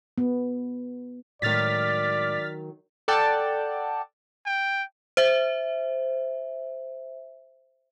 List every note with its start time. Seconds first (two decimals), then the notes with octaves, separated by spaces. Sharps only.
0.18 B3
1.42 A2 D#3 F#3 G#3 D5 F6 A6 B6
3.08 A4 D5 F#5 G5 A5
4.46 G5
5.17 C5 E5